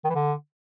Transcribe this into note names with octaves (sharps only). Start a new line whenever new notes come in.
D#3
E3
D3